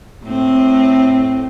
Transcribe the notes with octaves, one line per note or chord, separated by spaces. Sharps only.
A2 C4